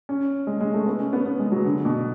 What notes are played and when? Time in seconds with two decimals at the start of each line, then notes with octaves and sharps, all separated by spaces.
0.09 C#4
0.47 G#3
0.61 G#3
0.74 A3
0.86 B3
1.00 C#4
1.13 B3
1.26 B3
1.39 G#3
1.52 F#3
1.65 D3
1.85 B2